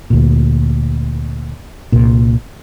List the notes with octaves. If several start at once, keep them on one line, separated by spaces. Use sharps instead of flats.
D2 A#2
C2 A#2